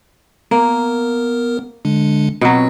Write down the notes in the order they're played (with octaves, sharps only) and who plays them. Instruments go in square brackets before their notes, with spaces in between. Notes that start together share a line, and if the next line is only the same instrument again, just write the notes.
[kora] A#3 [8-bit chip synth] B3 A#4
[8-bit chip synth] D3 G#3 D4
[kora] B2 F#3 [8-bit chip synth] C4